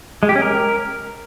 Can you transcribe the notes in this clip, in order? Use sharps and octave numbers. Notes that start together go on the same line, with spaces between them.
G#3
G4
C#4
A#4